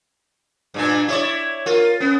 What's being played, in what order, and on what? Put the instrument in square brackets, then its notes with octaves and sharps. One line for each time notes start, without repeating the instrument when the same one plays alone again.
[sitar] G2 A#2 D4
E4 C#5 D5
[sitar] F4 [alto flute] A#4
[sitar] B3 [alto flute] C#4